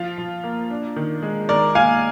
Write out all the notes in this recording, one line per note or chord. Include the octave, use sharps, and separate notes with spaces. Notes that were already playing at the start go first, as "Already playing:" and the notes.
Already playing: F3 F4
F3
A#3
D4
D#3
G#3
D#3 A#4 D5
A#3 F5 G#5